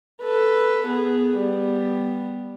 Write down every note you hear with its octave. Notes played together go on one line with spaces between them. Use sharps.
A4 B4
B3 G#4
G3 B3